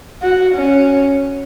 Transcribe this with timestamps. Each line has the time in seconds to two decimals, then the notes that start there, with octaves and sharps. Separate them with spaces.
0.22 F#4
0.55 C#4